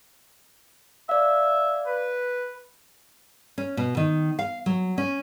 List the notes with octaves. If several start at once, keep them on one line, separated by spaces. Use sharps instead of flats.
D5 E5 F5
B4
C#4
B2
D#3
F5
F#3
C#4